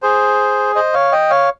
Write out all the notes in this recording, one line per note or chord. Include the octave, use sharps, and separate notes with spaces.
G#4 C5
C5 D#5
C#5 F5
D#5 G5
C#5 F5